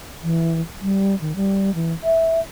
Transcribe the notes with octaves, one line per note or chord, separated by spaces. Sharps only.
E3
G3
D#3
G3
E3
E5